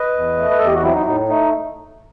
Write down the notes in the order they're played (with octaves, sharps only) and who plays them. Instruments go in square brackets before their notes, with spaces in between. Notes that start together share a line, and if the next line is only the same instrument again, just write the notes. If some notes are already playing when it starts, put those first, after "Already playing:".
Already playing: [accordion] B4 D#5
E2
A3
B4
E2 A4
G4
F#4
F#3 C4 E4
D#4
A2 D#4
A3 D#4